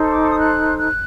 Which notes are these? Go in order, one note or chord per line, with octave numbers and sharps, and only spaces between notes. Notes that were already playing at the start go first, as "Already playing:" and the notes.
Already playing: D#4 A4 C5
D6
D#6
F#6
F#6